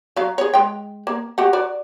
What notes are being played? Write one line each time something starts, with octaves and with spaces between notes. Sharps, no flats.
F#3 F5
G#4 C#5
G#3 G5
A#3
F#4 G4 F#5
F#4 D5